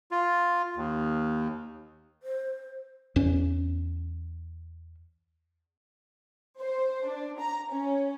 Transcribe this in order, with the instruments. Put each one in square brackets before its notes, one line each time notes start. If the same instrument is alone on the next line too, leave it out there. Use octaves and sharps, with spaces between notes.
[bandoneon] F4
D#2
[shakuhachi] C5
[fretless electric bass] E2 C#4
[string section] C5
D4
A#5
C#4